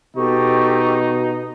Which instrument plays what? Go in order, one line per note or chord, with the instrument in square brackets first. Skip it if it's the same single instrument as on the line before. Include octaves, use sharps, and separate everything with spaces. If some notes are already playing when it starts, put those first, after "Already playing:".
[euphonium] B2 [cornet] D#4 [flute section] G4 A4 C#6